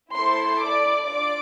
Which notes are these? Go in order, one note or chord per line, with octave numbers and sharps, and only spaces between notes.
A3 E4 A4 C5 C6
D5 D6
D4 F4 D5 D6